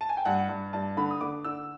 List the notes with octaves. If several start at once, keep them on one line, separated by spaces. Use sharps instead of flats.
A5
G#5
G5
G2 F#5
G2
G2 A5
D3 B5
D#6
D3 D6
D3 E6